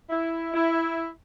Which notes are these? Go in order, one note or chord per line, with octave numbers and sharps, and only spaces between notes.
E4
E4